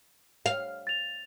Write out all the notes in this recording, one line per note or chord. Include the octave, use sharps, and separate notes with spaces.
F5
A6 F7